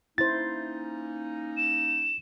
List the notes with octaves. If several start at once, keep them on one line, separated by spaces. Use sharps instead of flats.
A#3 C#4 D#4 E4 C5 A6
E7